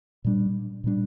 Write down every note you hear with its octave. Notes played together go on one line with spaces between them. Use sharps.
A#2 G3 D4
A#2 G3 D4